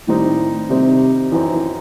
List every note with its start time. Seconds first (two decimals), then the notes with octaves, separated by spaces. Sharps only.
0.08 A2 D#3 G3 C4 D#4
0.70 C3 D#3 G3 C4 D#4
1.31 F#2 E3 F#3 C4 D#4
1.52 E3